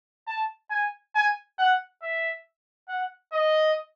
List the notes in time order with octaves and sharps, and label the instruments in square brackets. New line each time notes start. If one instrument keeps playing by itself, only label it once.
[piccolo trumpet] A5
G#5
G#5
F#5
E5
F#5
D#5